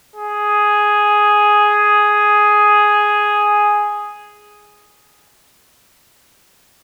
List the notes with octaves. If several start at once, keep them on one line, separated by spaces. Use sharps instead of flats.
G#4